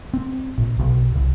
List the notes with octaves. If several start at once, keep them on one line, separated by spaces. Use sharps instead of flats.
C4
A#1
B1
C2